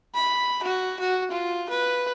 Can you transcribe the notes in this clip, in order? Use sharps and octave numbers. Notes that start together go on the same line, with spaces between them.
B5
F#4
F#4
F4
B4